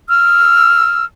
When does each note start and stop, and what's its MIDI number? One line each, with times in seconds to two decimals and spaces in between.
0.09 1.05 88
0.09 1.05 89